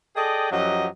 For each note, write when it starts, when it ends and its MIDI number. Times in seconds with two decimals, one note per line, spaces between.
0.16 0.48 68
0.16 0.48 69
0.16 0.48 74
0.16 0.48 75
0.16 0.48 79
0.51 0.88 42
0.51 0.88 53
0.51 0.88 54
0.51 0.88 67
0.51 0.88 75